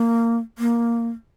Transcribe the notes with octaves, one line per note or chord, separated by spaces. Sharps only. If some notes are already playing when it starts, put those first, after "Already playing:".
Already playing: A#3
A#3